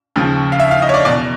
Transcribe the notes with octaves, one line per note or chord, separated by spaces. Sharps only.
D#2 C#3 F3
F5
E5
F5
D#5
C#5
D5
E2 B2 D5